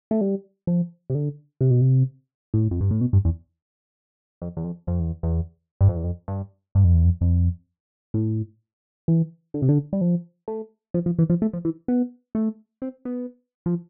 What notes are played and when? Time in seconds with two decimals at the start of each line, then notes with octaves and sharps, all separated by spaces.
0.11 A3
0.21 G3
0.67 F3
1.10 C3
1.15 D3
1.61 C3
1.70 B2
1.81 C3
2.54 A2
2.71 F2
2.81 G2
2.91 A2
3.01 B2
3.13 G2
3.25 E2
4.42 F2
4.57 E2
4.64 F2
4.87 F2
5.00 E2
5.23 E2
5.81 G2
5.88 F2
5.96 E2
6.04 F2
6.28 G2
6.75 G2
6.84 F2
6.94 E2
7.05 F2
7.21 F2
8.14 A2
9.08 E3
9.54 D3
9.62 C3
9.69 D3
9.93 G3
10.01 F3
10.48 A3
10.94 F3
11.06 F3
11.19 E3
11.30 F3
11.42 A3
11.53 F3
11.65 E3
11.88 B3
12.35 A3
12.82 C4
13.05 B3
13.66 F3